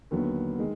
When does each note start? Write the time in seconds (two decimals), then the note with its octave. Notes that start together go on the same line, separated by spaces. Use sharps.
0.11 D#2 D3 F#3 B3
0.59 D#3 G#3